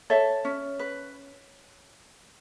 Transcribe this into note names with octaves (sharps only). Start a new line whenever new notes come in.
A4 C#5 E5
C#4
B4